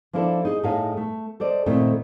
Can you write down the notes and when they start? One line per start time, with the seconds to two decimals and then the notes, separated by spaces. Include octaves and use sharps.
0.13 F3 A#3 D4 E4 A4
0.45 D#4 G#4
0.63 A2 D#4 G#4 A4 C#5 F5
0.97 A3
1.40 A4 C5 D5 D#5
1.66 A#2 D#3 A3 C4 D#4 E4